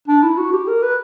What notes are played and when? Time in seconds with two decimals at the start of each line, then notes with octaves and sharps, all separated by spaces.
0.08 D4
0.23 E4
0.38 F#4
0.53 G4
0.68 A#4
0.82 B4